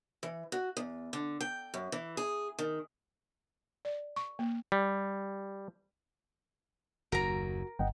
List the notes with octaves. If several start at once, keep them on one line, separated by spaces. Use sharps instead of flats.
E3
F#4
E2
D3
G5
F#2
E3
G#4
D#3
D5
C#6
A#3
G3
F#1 D#2 F#4 A#4 A#5
G1 D#5 F#5 G5